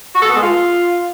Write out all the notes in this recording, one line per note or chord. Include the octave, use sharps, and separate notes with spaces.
F#4
A4
B3
G#3
F4